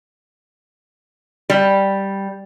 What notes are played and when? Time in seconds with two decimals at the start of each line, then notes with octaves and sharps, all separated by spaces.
1.50 G3